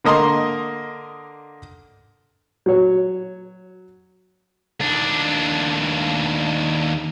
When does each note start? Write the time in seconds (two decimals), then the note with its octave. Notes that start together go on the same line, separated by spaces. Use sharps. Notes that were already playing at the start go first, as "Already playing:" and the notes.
0.04 D3 A#3 D#5 A#5 C6
2.66 F#3 C#5
4.80 D#2 D4